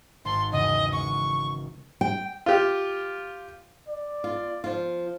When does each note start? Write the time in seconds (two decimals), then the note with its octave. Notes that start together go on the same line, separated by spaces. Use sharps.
0.25 G#1 A5 C6 C#6
0.52 E2 G#2 C#3 D#5
0.92 G#3 C#6 D#6
2.01 G5
2.46 F4 G4
3.88 D5
4.24 F4
4.64 F3 F4